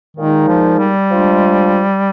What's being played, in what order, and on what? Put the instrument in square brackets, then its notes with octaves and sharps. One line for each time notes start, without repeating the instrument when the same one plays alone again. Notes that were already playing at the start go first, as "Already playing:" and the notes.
[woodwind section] A#2 G#3 D#4 G#4 [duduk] D#3
[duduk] F3
G3
[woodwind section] F3 G#3 D4 F4